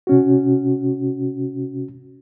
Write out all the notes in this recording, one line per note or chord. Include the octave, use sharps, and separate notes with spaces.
C3 C#4 F#4